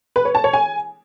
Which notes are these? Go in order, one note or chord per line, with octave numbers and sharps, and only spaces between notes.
B4
C#5
A5
C#5
G#5